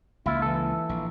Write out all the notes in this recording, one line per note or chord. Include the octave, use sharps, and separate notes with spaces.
C#2 A#3 E4 F4
E3 A4
A#1